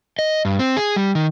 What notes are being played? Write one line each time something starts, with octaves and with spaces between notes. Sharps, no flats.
D#5
G2
C4
G#4
G3
D#3